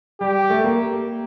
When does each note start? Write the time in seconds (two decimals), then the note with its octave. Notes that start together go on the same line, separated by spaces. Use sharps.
0.20 G3 G4
0.50 A3
0.64 A#3